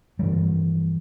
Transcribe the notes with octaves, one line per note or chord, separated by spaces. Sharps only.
G2 E3 F3 G3